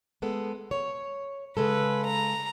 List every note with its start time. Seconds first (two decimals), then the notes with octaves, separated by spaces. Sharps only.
0.22 G#3 B3 A4
0.71 C#5
1.57 C#3 G#3 A4 B4
2.06 A#5